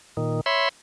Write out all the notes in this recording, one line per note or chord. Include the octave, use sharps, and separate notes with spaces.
A#2 D#3
C#5 E5 B5 C6